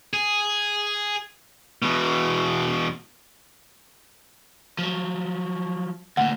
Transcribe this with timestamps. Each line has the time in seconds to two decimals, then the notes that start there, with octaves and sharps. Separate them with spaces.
0.13 G#4
1.82 E2 B2
4.79 F3 F#3
6.17 D2 A#2 F#5